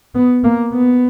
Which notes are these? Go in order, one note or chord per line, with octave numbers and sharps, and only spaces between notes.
B3
A#3
B3